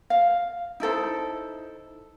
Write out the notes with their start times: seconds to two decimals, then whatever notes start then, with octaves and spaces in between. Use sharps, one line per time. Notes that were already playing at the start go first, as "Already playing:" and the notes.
0.10 F5
0.80 D#4 E4 A4 C5